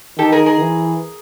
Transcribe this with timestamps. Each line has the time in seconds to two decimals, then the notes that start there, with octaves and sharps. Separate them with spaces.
0.19 D#3 G4 A4
0.32 G#4 A#4
0.46 G#4 A#4
0.60 E3